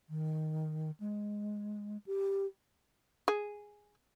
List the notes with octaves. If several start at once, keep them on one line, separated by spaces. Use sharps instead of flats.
D#3
G#3
G4
G#4